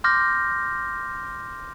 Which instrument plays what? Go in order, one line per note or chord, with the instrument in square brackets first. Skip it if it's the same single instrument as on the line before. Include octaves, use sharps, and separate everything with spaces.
[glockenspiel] C6 D6 F6 G6 A#6